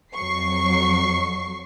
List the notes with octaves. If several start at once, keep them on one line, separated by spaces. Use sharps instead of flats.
F2 F#3 C#6 C7